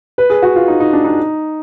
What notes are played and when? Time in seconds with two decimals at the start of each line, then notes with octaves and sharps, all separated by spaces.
0.18 B4
0.30 G#4
0.42 F#4
0.56 F4
0.68 D#4
0.80 D#4
0.93 D4
1.04 D#4